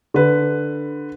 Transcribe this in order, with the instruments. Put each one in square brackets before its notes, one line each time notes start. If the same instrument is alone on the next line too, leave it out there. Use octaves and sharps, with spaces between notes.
[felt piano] D3 B4